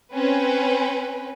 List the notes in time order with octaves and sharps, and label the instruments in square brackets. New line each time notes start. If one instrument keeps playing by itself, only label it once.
[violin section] C4 C#4 B4